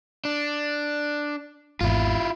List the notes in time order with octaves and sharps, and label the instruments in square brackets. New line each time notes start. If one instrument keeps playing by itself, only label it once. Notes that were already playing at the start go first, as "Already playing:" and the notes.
[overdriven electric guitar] D4
[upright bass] G#1 E2 [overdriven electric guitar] E4 F4